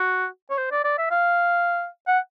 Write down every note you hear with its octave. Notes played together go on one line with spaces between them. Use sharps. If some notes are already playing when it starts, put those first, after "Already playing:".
Already playing: F#4
C#5
C5
D5
D5
E5
F5
F#5